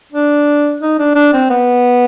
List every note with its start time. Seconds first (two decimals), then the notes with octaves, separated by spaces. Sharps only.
0.12 D4
0.82 D#4
0.99 D4
1.15 D4
1.33 C4
1.50 B3